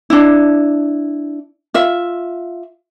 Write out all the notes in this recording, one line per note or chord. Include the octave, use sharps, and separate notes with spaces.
D4 E4
F4 E5